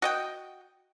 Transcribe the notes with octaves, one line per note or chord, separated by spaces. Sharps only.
F#4 D#5 G5